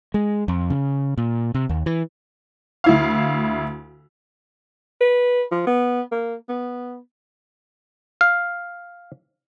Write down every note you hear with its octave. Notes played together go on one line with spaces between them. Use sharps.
G#3
F2
C#3
A#2
C3
D#2
E3
D2 E4 F5
B4
F3
B3
A#3
B3
F5